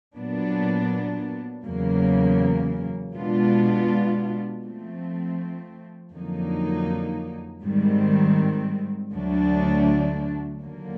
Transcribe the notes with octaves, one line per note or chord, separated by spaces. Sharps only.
A#2 F#3 B3 D4
E2 C#3 F#3 A#3
B2 G#3 B3 D4 F4
F3 A3 C4
F2 D3 F#3 A#3 D#4
G#2 D#3 G3 C4
D2 D3 F#3 A3 D4
D#2 D3 F#3 A#3